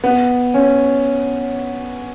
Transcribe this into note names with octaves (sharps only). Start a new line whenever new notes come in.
B3
C#4